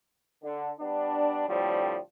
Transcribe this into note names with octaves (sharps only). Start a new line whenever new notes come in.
D3
G3 B3 D4
A2 D3 F3 G3 C4